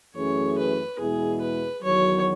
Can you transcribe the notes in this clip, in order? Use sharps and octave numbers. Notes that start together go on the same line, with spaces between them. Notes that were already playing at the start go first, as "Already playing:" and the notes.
F#2 E3 A3 C#4 G#4 C#5
B4
E2 B2 G#3 B3 E4 G#4
B4
E2 D#3 F#3 C#5